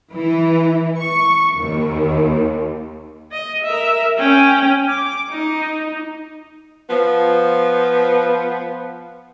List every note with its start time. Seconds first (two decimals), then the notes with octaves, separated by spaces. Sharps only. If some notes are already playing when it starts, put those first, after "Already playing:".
0.13 E3
0.99 C#6
1.58 D#2
3.32 D#5
3.63 A#4 E5
4.18 C#4 G5
4.89 D6
5.30 D#4
6.90 F3 B3